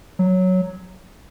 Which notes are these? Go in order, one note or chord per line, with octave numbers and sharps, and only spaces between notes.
F#3